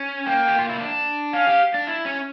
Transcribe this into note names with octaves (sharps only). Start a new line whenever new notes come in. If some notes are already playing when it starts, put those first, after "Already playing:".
Already playing: C#4
A#3 G5
G4
F4
E4
D4
C#4 F5
G4
D4
E4
C#4